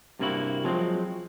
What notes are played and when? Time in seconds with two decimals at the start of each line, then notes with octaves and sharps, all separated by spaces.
0.19 G2 C3 A#3 D4 E4 F#4
0.64 F3 F#3 G#3 C4